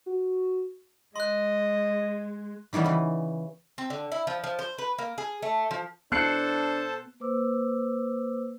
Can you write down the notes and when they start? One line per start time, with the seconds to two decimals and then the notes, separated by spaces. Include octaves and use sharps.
0.06 F#4
1.16 G#3 D#5 C6 F#6
2.73 D#3 E3 G3 B3 C#4
2.84 C#3 E3
3.78 C4
3.90 D3
4.12 E4
4.27 F3
4.44 F3
4.59 C5
4.78 B4
4.98 A#3
5.18 G#4
5.43 A3
5.71 F3
6.12 B3 D4 A4 C5 A5 F#6 C7 C#7
7.20 A#3 B4 C5 D6 E6